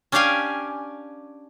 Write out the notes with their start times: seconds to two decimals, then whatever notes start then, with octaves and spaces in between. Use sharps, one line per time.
0.12 C#4 D4 G4 D5 F5 G#5